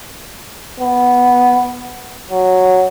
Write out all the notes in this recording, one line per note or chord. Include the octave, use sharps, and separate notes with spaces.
B3
F#3